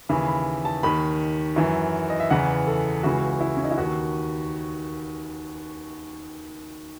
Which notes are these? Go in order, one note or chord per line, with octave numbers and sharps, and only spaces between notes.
D#2 C#3 E3 B5
B5
A5
D#2 D#3 B5
F#2 E3
D#5
E5
E2 C#3 E3 F#5
A4
C#2 C#3 E3 F#4
E4
C#4
D#4
E4
D#2 D#3 F#4